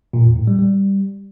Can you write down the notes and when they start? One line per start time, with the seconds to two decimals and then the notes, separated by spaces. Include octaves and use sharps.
0.13 A#2
0.25 E2
0.36 A2
0.47 G3
0.59 G3